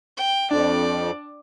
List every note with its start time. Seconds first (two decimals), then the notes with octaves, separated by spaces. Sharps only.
0.17 G5
0.51 F2 D4 D5